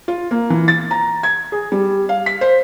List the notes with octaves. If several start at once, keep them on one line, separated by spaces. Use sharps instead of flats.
F4
A#3
E3
A6
A#5
G#6
G#4
G3
F5
B6
C5